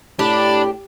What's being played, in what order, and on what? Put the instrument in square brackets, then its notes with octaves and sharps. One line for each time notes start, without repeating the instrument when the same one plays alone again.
[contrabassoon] A2 [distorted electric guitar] D4 [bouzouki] G4 [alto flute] B5